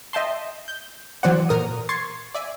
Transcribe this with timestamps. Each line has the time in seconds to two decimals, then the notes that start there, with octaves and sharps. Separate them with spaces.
0.13 D#5 E5 G5 A5 C6
0.68 G6
1.23 E3 F#3 C5 D5 F#5
1.49 A#2 A#4 D#6
1.89 C6 C#6 G#6 A6 C7 C#7
2.35 D5 E5 G#5